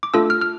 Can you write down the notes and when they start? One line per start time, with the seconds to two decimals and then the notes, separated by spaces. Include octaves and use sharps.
0.03 D6
0.14 A3 D4 F4 A4 E6
0.30 F6
0.41 F6